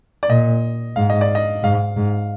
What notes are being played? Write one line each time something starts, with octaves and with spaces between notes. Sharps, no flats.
D5
A#2 D#5
G#2 F5
D#5
D5
D#5
G#2 F5
G#2